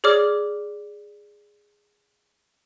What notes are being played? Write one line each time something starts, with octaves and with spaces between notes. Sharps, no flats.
G#4 C#5 D5 D6 F6